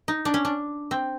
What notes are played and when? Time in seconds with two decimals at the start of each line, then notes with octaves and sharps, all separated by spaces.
0.08 D#4
0.25 D4
0.34 C#4
0.45 D4
0.91 C4